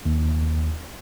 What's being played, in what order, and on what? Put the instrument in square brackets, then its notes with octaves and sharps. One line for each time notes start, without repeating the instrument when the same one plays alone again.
[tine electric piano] D#2